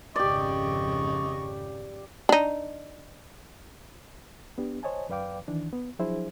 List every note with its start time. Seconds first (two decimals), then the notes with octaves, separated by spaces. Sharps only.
0.16 G#1 F2 C#3 G4 D5 D#5 C#6
2.29 D4 D#4
4.58 B3 D4 G4
4.83 C5 C#5 D#5 G#5 A5
5.09 F#2 B4 D5 F5 G5 D6
5.48 D#3 E3 D4
5.73 B3
5.99 F3 F#3 D4 E4 G#4 C5